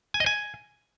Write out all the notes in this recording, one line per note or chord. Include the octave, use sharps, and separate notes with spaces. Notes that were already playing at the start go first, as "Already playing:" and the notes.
G#5
D#5
G#5